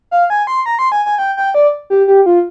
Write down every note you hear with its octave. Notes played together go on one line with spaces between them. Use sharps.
F5
G#5
C6
A#5
C6
G#5
G#5
G5
G5
D5
G4
G4
F4